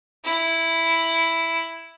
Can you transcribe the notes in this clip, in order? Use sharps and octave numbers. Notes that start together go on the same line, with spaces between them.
E4